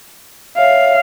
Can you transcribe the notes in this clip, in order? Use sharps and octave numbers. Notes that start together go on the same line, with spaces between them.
C#5 E5 F5